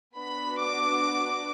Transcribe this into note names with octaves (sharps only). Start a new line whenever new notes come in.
B3 D4 F#4 B5
D6